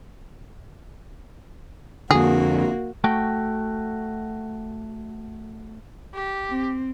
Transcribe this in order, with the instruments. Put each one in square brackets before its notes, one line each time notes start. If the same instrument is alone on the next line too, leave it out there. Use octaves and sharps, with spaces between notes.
[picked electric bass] F2 D3 [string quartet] A#3 F#4 [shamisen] G#4
[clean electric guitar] A3 F#4 G5
[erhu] G4
[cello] C4